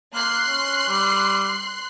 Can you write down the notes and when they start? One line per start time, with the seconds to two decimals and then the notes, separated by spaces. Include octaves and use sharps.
0.14 A#3 C6 F#6 C7
0.48 C#4
0.88 G3